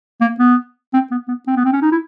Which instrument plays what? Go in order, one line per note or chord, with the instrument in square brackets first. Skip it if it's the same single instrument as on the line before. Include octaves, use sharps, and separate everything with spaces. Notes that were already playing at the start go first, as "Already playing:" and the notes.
[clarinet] A#3
B3
C4
B3
B3
C4
B3
C4
C#4
D#4
E4